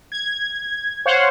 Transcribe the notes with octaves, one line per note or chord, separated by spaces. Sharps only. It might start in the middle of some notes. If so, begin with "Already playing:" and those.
G#6
C5 C#5 F5 F#5